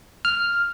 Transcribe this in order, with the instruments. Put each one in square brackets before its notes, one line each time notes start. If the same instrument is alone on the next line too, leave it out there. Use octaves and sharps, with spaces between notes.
[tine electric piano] F6